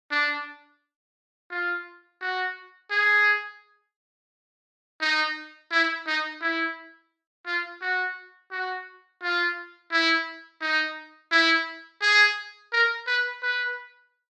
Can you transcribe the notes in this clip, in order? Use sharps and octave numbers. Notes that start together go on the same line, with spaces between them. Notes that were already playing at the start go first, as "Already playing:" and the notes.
D4
F4
F#4
G#4
D#4
E4
D#4
E4
F4
F#4
F#4
F4
E4
D#4
E4
G#4
A#4
B4
B4